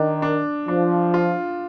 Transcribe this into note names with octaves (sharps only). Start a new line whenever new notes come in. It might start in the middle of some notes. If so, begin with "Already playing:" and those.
Already playing: D#3 D4
D4
F3 D4
F4